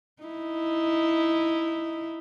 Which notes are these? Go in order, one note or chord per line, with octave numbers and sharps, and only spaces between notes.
D#4 E4